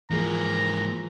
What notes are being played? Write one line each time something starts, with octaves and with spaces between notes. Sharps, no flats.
G#2 E3 F3 A#3 G#4 A#5